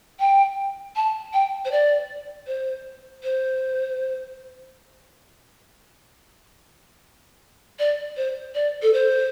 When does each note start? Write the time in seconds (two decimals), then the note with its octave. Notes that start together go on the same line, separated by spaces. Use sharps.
0.20 G5
0.96 A5
1.34 G5
1.65 C5
1.72 D5
2.47 C5
3.24 C5
7.79 D5
8.17 C5
8.55 D5
8.82 A4
8.93 C5